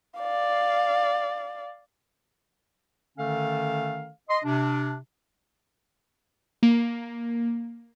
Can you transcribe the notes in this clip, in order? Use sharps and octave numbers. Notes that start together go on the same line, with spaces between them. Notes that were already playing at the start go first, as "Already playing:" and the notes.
D5 F5
D3 D#3 A3 C#4 A4 F5
D#5 C6
C3 D4
A#3